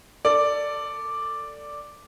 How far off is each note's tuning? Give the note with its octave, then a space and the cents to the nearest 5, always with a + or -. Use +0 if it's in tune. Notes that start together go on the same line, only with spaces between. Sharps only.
A4 +25 D5 +0